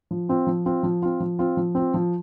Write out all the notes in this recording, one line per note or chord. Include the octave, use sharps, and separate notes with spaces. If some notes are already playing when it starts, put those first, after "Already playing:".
F3
C4 F4
F3
C4 F4
F3
C4 F4
F3
C4 F4
F3
C4 F4
F3